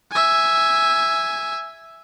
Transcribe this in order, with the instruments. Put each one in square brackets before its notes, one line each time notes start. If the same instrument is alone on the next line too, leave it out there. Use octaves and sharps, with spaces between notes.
[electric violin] E5 G#5